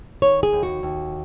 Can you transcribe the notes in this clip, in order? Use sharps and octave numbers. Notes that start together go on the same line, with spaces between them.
D#3 C#5
G#4
D#2
F#4
D#2